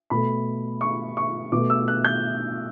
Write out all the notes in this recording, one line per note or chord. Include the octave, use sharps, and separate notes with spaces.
B2 A3 B5
C#6
C#6
B2 A3 D6
E6
F#6
G6